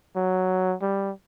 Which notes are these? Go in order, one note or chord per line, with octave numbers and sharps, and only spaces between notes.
F#3
G3